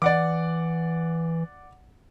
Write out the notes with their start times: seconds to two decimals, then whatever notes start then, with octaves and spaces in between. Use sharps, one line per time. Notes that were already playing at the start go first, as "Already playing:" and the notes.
0.02 E3 D5 F#5 D6